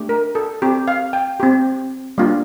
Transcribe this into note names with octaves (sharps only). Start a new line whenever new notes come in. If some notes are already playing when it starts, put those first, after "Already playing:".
Already playing: A3 D4 G4
A#4
A4
C4 G4
F5
G5
C4 G4
G3 A#3 D4 F4